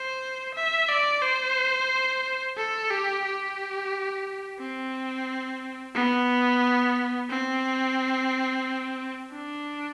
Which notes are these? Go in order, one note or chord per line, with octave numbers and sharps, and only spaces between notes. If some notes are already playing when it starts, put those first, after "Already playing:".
Already playing: C5
E5
D5
C5
A4
G4
G4
C4
B3
C4
D4